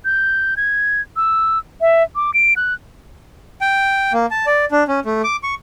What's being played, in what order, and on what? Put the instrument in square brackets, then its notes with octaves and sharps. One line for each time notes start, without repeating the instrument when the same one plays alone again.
[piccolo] G6
G#6
E6
E5
D6
D7
F#6
[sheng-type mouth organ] G5
A#3
A5
D5
D4
C#4
A3
D6
C#6